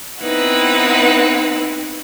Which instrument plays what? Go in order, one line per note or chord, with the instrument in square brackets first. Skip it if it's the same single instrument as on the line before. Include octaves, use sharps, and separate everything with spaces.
[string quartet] B3 C4 D#4 E4 B4 F#5